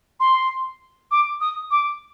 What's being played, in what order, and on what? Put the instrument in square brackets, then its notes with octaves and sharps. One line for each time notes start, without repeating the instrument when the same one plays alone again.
[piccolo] C6
D6
D#6
D6